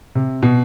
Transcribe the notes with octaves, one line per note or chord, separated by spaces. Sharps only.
C3
B2